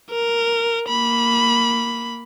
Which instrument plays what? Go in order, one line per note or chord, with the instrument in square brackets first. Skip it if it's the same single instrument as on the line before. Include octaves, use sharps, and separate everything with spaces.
[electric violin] A#4
A#3 B5